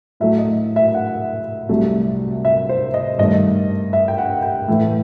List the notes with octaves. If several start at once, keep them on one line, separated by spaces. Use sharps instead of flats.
A2 F#3 A3 E5
D#5
E5
F#5
C2 C3 F#3 A3
E5
C5
D#5
G2 D#3 A3 D#5
E5
G5
F#5
G5
A2 E3 A3